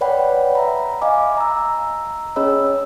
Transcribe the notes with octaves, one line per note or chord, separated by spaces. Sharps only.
B4 C#5 D5 F#5 G5 B5
E5 A#5 B5
D#5 F5 G#5 D6
A#5 E6
C#4 G#4 C#5 D#5 B5 E6